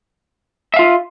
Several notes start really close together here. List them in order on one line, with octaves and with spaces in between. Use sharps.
E5 F5 F4